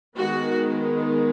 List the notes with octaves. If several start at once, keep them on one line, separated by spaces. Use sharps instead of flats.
D#3 G#3 B3 F#4